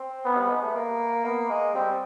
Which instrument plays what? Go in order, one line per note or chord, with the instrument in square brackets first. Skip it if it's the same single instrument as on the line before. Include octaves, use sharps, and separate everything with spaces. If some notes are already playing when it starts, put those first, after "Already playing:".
Already playing: [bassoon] C4
[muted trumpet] B3
[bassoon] G3
G#3
A3
A#3
[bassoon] A#3 [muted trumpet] B3
[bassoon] G#3
[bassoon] G3 [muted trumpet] C4